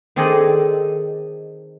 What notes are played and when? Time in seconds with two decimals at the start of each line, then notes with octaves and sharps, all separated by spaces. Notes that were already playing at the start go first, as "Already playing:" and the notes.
0.16 D#3 C4 G#4 A4 D5 D#5